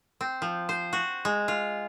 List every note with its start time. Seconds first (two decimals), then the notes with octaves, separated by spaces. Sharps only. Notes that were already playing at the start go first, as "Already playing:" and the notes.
0.21 C4
0.42 F3
0.69 C5
0.93 F#4
1.25 G#3
1.48 F4